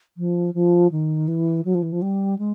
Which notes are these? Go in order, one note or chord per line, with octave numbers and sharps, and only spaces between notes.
F3
F3
D#3
E3
F#3
F3
E3
F3
G3
G#3